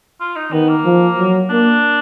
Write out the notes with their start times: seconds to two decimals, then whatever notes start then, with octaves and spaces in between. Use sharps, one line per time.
0.20 F4
0.36 D#4
0.52 D#3 B3
0.69 A#3
0.85 F3
1.18 F#3
1.50 A#3 D4